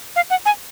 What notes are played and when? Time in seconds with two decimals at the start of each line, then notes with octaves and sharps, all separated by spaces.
0.16 F5
0.30 F#5
0.46 G#5